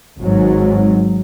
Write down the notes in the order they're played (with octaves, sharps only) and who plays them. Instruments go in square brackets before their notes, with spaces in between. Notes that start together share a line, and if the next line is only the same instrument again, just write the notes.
[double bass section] G#1 G#2 F#3